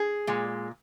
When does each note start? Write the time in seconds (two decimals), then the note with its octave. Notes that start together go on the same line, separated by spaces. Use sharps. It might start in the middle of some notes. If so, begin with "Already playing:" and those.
Already playing: G#4
0.27 A#2 G#3